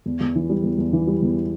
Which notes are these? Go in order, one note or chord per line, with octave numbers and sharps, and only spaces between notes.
E2
E2
E3
G3
E2
E2
E3
G3
E2